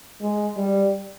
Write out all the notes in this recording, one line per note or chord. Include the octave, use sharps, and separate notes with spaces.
G#3
G3